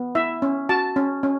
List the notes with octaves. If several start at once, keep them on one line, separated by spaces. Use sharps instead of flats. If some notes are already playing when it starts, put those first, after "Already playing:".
Already playing: B3
E4 E5
C#4
F#4 A5
C#4
C#4